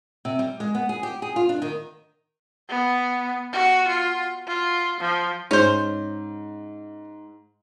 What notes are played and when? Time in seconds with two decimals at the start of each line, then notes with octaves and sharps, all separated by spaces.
0.25 C3
0.39 G3
0.60 G#3
0.75 B3
0.89 G#4
1.03 G4
1.22 G#4
1.36 F4
1.49 D4
1.62 D#3
2.69 B3
3.53 F#4
3.88 F4
4.47 F4
5.00 F3
5.51 G#2 C#4 C5